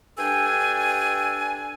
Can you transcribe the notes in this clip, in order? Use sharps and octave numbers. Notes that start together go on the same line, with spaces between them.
G2 G3 D4 A4 G5 G#5